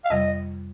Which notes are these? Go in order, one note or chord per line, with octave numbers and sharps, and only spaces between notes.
F5
F2 C3 G3 D#5